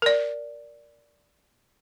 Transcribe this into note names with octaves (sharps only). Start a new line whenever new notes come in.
A#4 D5